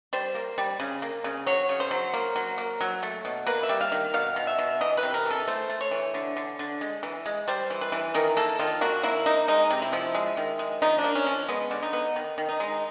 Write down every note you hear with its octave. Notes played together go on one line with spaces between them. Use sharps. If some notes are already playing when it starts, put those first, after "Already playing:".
G3 C5
A#3
G3
C#3
A#3
C#3
F#3 C#5
C#3
C5
F#3
A#3
F#3
A#3
F#3
A3
B2
A#3 B4
E5
G3
F5
D#3
B2 F5
B2
E5
B2
E3 D#5
B4
C3
A#4
E3 A4
A3 C5
A3
C#5
E3
D3
D3
D3
G#3
E3
G#3
G3 C5
E3
B4
E3
D#3 A#4
A#3 A4
D#3 F4
A#3 F#4
A#3 E4
A#3 D#4
G#3 D#4
C3
E4
F3
G#3
D#3
G#3
F3 D#4
D4
A#3
C#4
F3
G#3 B3
D3
D#4
B3
D#3
D#3
D#4
G#3